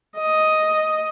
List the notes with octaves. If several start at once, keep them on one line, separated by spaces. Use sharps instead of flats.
D#5